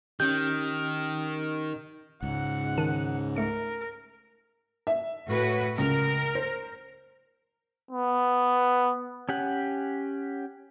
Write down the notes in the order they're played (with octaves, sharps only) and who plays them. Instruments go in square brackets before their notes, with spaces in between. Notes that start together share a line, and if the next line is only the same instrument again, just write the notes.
[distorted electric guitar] D#3 [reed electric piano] C#4 G4 [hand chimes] G6
[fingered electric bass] C#2 [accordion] G#2 [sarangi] F#5
[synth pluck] D#3 A5 D#7
[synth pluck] A3 C#7 [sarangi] A#4
[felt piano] E5
[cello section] A2 F#4 B4
[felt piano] C#2 [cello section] A#4
[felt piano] C5
[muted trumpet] B3
[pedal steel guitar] C#4 G4 F#5